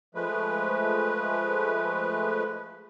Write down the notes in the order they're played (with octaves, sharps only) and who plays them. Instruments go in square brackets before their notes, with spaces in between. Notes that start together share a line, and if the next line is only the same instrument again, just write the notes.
[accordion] F3 G#3 A3 B4